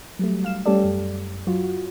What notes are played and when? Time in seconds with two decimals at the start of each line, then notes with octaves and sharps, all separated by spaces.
0.19 F#3 G3 A3
0.43 G2 F5 E7
0.66 G3 A3 C#4 G4 A4 D5
0.84 F#2
1.47 F#3 F4 F#4